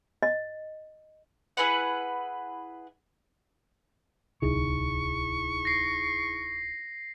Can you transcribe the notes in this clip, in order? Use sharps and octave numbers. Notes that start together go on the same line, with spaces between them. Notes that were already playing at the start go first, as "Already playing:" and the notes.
D#5
E4 G#4 B4 F#5
D1 C2 D#4 E4 G#4 C#6
A#6 C7